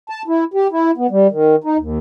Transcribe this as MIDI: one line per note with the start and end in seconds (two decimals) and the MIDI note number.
0.10 0.22 81
0.28 0.44 64
0.54 0.67 67
0.72 0.91 64
0.97 1.07 59
1.11 1.27 55
1.31 1.56 51
1.64 1.77 63
1.78 1.98 39